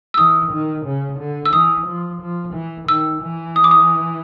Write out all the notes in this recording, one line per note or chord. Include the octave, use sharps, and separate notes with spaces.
E6
E3 D#6
D#3
C#3
D3
E6
E3 D#6
F3
F3
E3
D#3 E6
E3
D#6
D6
D#6